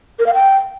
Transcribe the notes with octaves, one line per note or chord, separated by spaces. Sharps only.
A#4
F5
G5